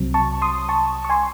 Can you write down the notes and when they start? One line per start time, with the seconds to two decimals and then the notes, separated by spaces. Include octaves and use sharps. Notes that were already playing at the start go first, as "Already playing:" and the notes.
Already playing: C2 C3 F#3 C4
0.14 A5 C#6
0.42 C6 D#6
0.69 A5 C#6
1.05 C#6
1.10 G#5 C6